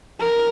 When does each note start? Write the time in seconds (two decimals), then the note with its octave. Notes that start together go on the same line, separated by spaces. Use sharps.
0.20 A#4